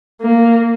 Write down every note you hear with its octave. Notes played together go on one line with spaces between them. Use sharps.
A#3